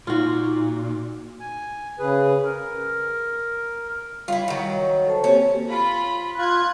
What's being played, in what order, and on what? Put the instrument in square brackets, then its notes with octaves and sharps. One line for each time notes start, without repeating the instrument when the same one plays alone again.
[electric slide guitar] A#2 [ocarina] D#4 [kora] F4 F#4
[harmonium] G#5
C#3 G#4 B4
A#4
[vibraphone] G3 [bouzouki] E4 F4
[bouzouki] D#3 F#3 [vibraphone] E5
[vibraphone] A4 C5 A5
[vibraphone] A#3 C4 G4 [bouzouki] C#4
[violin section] F4 B5
[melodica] F4 [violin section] F#6 G#6